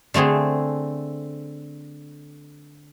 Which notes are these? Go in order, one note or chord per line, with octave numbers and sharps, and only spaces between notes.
D3 A3 C4 G#4